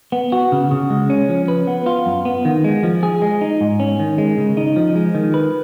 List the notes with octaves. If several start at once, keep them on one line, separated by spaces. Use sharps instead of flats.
B3
F#4
C#3
C#3
G#3
C#4
F3
B4
B3
F4
F#2
B3
D#3
G#3
F3
G#4
G#3
D#4
G#2
C#4
D#3
G#3
C#3
D#4
F3
G#3
D#3
B4